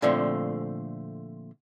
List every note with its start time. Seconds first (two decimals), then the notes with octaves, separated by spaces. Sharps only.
0.02 A#2 D3 F3 A3 C4